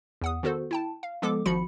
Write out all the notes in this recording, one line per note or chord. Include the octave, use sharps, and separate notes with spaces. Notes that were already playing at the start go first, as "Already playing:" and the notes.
E2 F#5 D#6
D#3 B3 F#4 A4 C5
E4 G5 A5
F5
F3 G#3 B3 A4 D6
G#1 F3 F#4 B5 C#7